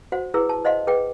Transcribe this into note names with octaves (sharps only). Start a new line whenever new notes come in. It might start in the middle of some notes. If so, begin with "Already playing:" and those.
F#4 C5 F#5
E4 G#4 B4 E6
A5
C5 D#5 F5 F#5 C6
G#4 B4 G5